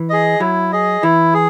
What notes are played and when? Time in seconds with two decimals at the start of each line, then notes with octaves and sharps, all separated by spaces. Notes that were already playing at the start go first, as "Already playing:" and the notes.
Already playing: E3
0.10 G#4 D#5
0.40 F#3 E4
0.72 G#4 D#5
1.03 E3 E4
1.34 G#4